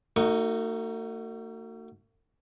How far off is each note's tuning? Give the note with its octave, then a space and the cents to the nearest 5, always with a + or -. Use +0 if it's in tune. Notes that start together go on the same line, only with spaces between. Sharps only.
A3 +45 D#4 +0 F#4 +0